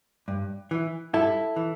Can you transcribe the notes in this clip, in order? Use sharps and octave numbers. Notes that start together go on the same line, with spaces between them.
G2
E3
G2 E4 A4
E3